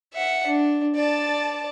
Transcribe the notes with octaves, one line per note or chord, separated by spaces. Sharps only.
E5 F#5
D4
D5 A5